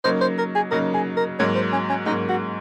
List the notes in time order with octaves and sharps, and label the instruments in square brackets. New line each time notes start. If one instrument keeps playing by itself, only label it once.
[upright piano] C#3 F#3 A#3 D#4 [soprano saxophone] C5
[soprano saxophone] C5
A#4
G#4
[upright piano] C#3 F#3 A#3 D#4 [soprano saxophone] A#4
[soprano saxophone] G#4
A#4
[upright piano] G#2 F#3 A#3 [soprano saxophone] C#5
[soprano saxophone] C5
C#4
C#4
[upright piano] G#2 F#3 A#3 [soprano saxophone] D#4
[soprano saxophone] F#4